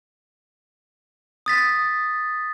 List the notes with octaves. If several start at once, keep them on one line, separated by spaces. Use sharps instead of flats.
D#6 A6 B6